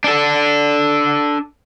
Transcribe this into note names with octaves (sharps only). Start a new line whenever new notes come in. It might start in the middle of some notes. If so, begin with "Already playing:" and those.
D4 A4